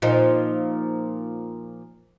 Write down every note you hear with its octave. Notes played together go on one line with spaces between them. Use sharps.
A#2 F3 D#4